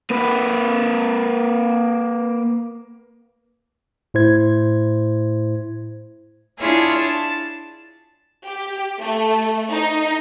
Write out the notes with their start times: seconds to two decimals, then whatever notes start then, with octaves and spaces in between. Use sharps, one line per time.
0.11 A#3 B4
4.14 A2 E4 C5 G#6
6.58 D4 E4 F4 G#4 C#5
6.96 A5
8.46 G4
9.00 A3
9.72 D#4